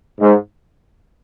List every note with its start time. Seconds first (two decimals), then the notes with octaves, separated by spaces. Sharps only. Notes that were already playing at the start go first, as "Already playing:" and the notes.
0.20 G#2